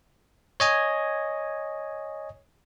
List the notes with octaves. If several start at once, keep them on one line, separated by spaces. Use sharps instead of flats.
C#5 D#5 G#5